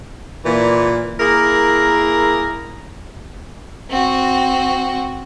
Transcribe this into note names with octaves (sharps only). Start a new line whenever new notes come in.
A#2 E3
A#3 E4 G#4 A#4
C4 F#4